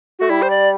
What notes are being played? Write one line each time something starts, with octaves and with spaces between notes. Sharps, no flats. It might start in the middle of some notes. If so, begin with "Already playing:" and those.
A3 F#4
G3 E4
C5
D5